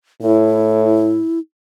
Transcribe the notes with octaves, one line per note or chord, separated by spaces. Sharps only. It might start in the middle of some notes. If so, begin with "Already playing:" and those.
A2 E4